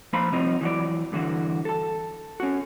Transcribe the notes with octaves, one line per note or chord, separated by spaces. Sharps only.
F3 A#3 D#4 C5 A#5 B5
C3 F3 G3 C4 D#4
E3 F#3 D5
G2 D3 E3 F#4
A4 A5
C#4 F#4